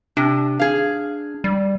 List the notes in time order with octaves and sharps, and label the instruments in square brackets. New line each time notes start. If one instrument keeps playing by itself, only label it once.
[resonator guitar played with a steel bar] C3 [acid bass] D4
[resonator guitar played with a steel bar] G#4 F5
[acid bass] G3